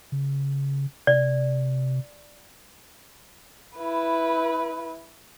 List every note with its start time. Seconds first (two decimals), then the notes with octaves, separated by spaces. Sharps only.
0.12 C#3
1.07 C3 D5
3.77 E4 B4